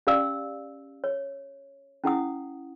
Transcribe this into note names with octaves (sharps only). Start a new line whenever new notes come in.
C#4 G4 D5 F5 E6
C#5
C#4 E4 F#5 D#6